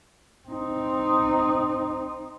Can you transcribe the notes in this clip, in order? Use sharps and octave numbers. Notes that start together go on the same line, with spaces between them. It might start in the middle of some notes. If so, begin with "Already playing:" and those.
C4 D#4